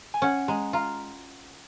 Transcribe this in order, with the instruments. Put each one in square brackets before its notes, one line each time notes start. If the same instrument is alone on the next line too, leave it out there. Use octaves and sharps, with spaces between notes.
[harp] G#5
[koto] C#4 [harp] F#5
[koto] G#3 [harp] A#5
[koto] F4 [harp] A#5